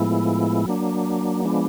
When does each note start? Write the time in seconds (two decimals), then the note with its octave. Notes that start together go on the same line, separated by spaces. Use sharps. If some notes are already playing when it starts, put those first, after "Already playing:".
Already playing: A2 F3 G#3 B3 E4
0.66 F#3 A#3 D4
1.45 F3 G#3 B3 D4